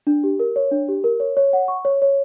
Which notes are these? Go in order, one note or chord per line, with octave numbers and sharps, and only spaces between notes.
D4
G4
A#4
C#5
D4
G4
A#4
C#5
C#5
F#5
C#6
C#5
C#5